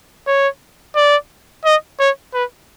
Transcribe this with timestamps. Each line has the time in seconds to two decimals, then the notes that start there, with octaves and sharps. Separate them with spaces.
0.27 C#5
0.95 D5
1.65 D#5
1.99 C#5
2.34 B4